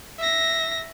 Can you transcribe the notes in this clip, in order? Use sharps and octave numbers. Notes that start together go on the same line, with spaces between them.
E5 A#6